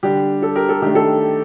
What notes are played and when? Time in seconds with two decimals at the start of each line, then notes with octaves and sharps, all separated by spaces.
0.03 D3 G3 D4 G4
0.42 A4
0.55 G4 A#4
0.69 A4
0.82 D#3 A3 D4 G4
0.95 A4